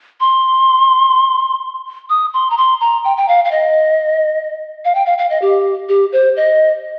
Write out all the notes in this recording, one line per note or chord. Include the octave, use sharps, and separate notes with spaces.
C6
D#6
C6
A#5
C6
A#5
G5
G5
F5
F5
D#5
F5
G5
F5
F5
D#5
G4
G4
C5
D#5